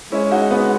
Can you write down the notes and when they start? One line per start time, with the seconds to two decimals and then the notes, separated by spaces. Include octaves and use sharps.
0.12 G#3 C#4 E4
0.31 D#4 F#4
0.51 B3